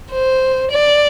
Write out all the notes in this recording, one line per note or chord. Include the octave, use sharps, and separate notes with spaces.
C5
D5